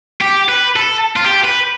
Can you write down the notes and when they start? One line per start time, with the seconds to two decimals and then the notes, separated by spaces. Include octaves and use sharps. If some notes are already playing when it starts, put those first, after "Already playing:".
0.21 G4
0.49 B4
0.76 A4
1.16 F4
1.24 G4
1.44 B4